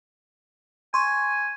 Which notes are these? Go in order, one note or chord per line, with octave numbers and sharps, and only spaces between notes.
G#5 C6 C#6